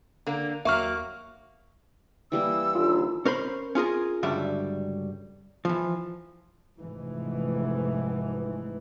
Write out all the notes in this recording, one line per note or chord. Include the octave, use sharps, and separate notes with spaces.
D3 A#3
D#2 F#3 A#3 E5 C#6 F6
E3 G3 A#3 E6
D#2 D3 F4
C#4 A#4 C5 B5
C#4 F4 G#4 A#4
C#2 G2 D3 F#3 G3 E5
E3 F3
F1 G#2 E3